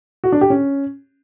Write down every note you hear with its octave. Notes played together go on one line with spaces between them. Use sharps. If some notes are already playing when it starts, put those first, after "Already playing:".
F#4
D4
G4
C#4